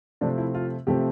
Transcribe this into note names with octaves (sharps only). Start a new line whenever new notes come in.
C3 F3 A3 C4 D4
E4
F4
C3 F3 A3 C4 G4